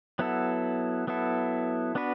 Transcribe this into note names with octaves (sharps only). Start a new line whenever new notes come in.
F#3 B3 E4 A4
F#3 B3 E4 A4
B3 D4 F#4 B4